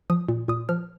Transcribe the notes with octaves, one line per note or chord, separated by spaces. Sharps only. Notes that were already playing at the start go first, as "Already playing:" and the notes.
F3 D#6
A#2
A#2 D#6
F3 F6